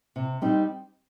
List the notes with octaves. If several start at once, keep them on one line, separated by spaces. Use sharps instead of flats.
C3
G3 C4 D#4